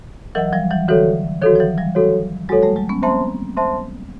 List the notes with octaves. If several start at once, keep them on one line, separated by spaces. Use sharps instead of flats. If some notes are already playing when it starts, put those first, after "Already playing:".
E3 F#3 A#4 D#5 F#5
F3 G3
E3 F#3
D3 E3 F#4 A4 C#5
D#3 F3 F#4 A4 C#5
F3
E3 F#3
F3 G3
F#4 A4 C#5
F#3 G#3 F#4 A4 C#5
G3 A3
F#3 G#3
B3 C#4
A#3 C4 C5 E5 A5 C6
C5 E5 A5 C6